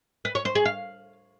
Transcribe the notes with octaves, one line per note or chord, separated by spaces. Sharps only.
B4
C#5
C5
G#4
F5